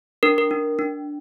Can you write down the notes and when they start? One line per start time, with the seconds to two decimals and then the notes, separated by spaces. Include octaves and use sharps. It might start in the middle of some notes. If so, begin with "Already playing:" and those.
0.23 D4 A#4
0.38 A#4
0.51 D4
0.79 D4